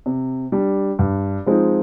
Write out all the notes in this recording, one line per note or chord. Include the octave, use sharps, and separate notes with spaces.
C3
G3 D4
G2
F3 G#3 C4 D#4